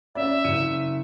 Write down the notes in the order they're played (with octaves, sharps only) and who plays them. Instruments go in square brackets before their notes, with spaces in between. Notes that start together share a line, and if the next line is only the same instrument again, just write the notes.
[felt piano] C#4 D5 [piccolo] E5
[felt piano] F#1 C#7 D#7